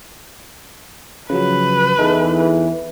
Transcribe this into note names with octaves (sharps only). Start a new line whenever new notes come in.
C#3 F3 F#3 B4
E2 E3 D#4 G#4 A4